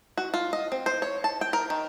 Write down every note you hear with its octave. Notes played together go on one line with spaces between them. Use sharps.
F#4
F4
D#5
C4
C5
C#5
A5
G5
A#4
D#3